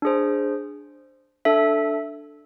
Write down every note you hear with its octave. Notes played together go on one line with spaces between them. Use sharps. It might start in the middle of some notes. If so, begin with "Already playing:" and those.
D4 G#4 C5
D4 A4 E5